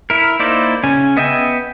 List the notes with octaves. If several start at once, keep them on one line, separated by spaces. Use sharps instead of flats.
E4 A#4
A#3 D#4 E4 C5 D5
C#3 C#4 G#5
B3 D#5 E5 G5 G#5